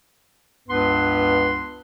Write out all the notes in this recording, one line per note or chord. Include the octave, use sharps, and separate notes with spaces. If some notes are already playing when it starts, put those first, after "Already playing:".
C#2 G2 B3 B4 C6